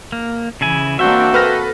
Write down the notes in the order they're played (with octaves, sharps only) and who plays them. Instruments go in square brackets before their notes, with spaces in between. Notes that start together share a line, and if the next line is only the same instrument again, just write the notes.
[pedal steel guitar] A#3
[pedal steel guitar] C#3 E4 G#5 [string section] E3
[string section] A#3 C4 D4 [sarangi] F#4 [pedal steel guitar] E5 G5
[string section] A4 [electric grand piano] B4 F6 A#6